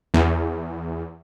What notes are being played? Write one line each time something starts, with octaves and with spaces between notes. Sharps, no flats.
E2